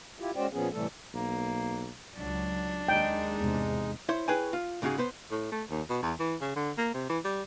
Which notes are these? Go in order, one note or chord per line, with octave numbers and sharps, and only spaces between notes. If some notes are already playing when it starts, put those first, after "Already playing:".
E4 F4 G4
G#3 C#4 F#4 C5 D5 G5
A#2 F3 B3 C#4 G#4
A2 C3 E3 G3 A3 A4
B1 A#3
C#2 F#3 D4
D#2 G#3 D#4 G5
E2 G#2 C3
E4 C5 C#5
E4 G#4 B4 C#5 G5 G#5
F4
G#2 C#3 G#3 F4 F#4 G#4
B3 B4 C5
A2
A3
D#2
B2
E2
E3
C#3
D3
A#3
C3
E3
G3